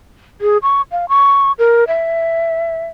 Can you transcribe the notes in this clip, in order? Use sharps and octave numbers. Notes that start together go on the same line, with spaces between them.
G#4
C#6
F5
C#6
A#4
E5